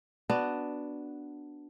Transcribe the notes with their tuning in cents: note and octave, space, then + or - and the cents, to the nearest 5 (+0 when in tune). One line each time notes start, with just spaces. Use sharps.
B3 +0 D4 +0 F#4 +5